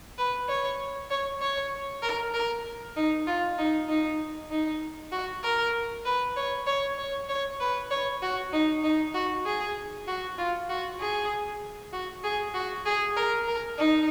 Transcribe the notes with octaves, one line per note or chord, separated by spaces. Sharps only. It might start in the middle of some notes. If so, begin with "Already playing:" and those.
B4
C#5
C#5
C#5
A#4
A#4
D#4
F4
D#4
D#4
D#4
F#4
A#4
B4
C#5
C#5
C#5
C#5
B4
C#5
F#4
D#4
D#4
F#4
G#4
F#4
F4
F#4
G#4
F#4
G#4
F#4
G#4
A#4
A#4
D#4